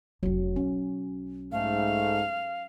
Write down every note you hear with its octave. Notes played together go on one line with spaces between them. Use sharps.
F1 F#3 C#4
B1 C#4
G#2 A3 F5